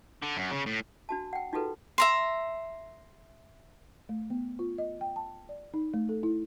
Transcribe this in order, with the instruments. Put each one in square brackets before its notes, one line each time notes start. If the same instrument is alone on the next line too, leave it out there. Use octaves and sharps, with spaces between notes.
[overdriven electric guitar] D3
F#2
C#3
A2
[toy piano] D4 F#4 A5
F#5 G5
D#4 F4 F#4 G#4 A4 B4
[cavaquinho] E5 A#5 C6
[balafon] A3
B3
F4
D#5
G5
A5
D5
D#4
A3
A4
E4